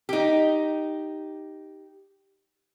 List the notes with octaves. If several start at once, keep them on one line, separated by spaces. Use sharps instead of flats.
D#4 G4